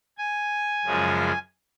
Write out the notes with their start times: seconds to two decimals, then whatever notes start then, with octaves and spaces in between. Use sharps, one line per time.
0.18 G#5
0.85 F#2 C#3 F3 G#3